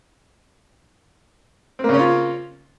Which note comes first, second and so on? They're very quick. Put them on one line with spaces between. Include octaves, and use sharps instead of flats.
C4 A#3 C#3 C#4 F4